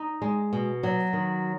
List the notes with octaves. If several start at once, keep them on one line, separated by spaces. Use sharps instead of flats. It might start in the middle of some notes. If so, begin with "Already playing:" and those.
Already playing: D#4
G#3
B2
F#3
D#3